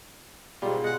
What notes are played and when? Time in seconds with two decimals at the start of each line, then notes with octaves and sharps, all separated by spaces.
0.62 G#2 B2 G3 F4
0.83 G#3 F#5